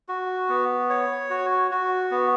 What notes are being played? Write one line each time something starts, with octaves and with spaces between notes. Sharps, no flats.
F#4
B3
C#5
F#4
F#4
B3